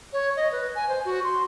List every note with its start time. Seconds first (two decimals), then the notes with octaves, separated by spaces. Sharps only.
0.13 C#5
0.36 D#5
0.52 B4
0.75 G#5
0.89 C5
1.05 F#4
1.24 C6